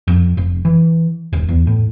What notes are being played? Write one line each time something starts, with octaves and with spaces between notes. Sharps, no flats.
F2
F1
E3
D#1
E2
A2